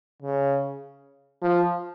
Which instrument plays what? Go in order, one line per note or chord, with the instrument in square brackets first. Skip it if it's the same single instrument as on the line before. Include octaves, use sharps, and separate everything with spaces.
[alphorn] C#3
F3